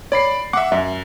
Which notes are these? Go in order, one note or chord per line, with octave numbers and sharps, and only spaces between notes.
C#5 D5 B5 C7
E5 F#5 D6
F#2 E5